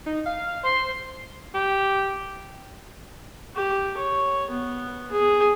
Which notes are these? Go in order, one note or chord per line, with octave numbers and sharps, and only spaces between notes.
D#4
F5
C5 C6
G4
G4
C#5
B3
G#4